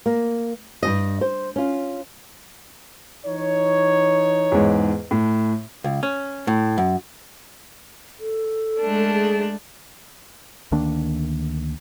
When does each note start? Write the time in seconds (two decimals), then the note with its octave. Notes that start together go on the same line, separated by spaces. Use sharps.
0.06 A#3
0.83 G2 C#3 D#5
1.21 C5
1.56 C#4 F4
3.26 E3 D#4 C#5
4.52 E2 G#2
5.11 A2
5.84 C#2
6.03 C#4
6.47 A2
6.78 F#2
8.20 A4
8.80 G#3 A3 D4
9.13 G#4
10.72 D2 D#3 A#3 D4